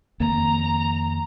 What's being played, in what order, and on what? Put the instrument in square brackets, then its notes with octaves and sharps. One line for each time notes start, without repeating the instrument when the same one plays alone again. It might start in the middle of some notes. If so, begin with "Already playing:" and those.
[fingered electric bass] F2 D#3 A#3 [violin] A#5